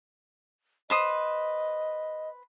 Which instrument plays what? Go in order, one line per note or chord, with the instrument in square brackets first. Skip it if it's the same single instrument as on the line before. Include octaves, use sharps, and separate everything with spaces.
[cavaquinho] B4 C5 D#6 [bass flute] D#5